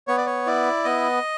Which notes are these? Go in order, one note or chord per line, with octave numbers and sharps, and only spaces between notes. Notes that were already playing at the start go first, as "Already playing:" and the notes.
B3 C#5
D5
C#5
E4 D5
B3 D#5